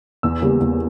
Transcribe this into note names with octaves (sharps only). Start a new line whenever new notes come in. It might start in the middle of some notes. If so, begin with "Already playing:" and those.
E2 E6
C#3 G3 A#3
E2